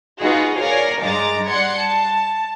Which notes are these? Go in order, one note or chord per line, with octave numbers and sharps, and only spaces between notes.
D#4 F4 F#4 G#4 B4
A#4 C#5 D5 F5 G#5
G2 G#3 A#5 D6 A6
G3 D5 F#5 C6 G#6 C#7
A5